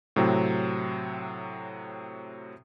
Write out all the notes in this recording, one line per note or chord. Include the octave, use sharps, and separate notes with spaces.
A2 C3 F#3 C4